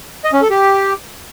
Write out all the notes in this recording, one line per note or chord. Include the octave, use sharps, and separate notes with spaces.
D#5
C#4
A4
G4